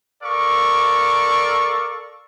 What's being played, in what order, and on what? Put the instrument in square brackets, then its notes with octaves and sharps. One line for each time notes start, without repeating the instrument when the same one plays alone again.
[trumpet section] A4 A#4 D5 F5 C#6